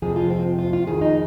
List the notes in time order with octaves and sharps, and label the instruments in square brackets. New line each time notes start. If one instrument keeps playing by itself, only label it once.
[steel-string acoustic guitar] F2 C3 F3 G#4
F4
C4
F4
F4
F2 D#3 G#4
D#4